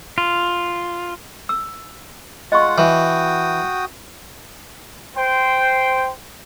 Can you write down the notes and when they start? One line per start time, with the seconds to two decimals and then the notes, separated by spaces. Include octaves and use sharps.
0.18 F4
1.49 E6
2.52 G#3 F4 D#5 F#5 C#6
2.78 E3 F#4 G5 D#6
5.16 C5 G5